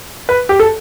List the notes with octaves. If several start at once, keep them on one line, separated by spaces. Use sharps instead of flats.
B4
G4
A4